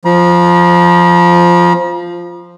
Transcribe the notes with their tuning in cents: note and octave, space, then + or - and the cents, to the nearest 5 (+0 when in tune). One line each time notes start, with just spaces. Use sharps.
F3 +0 A#5 +45